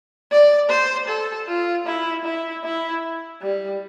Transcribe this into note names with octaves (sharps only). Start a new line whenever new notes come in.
D5
C5
A4
F4
E4
E4
E4
G3